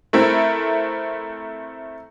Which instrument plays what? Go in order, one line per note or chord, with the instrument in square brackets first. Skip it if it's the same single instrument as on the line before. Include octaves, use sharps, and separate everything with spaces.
[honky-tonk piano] A3 C4 E4 A#4